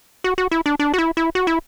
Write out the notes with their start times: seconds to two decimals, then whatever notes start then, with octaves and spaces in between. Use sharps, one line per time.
0.24 F#4
0.38 F#4
0.51 E4
0.66 D4
0.80 D4
0.94 F#4
0.98 E4
1.17 E4
1.35 F#4
1.47 E4